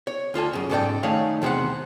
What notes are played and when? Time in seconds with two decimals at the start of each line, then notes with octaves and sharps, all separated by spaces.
0.07 C#5
0.34 D2 F4 A4 G#5
0.53 F#2 C#3
0.70 G#2 C#3 A4 C#5 D5 G5
1.03 D#3 A3 D#4 G#4 C#5 F5
1.42 E2 C3 G#4 C5 F#5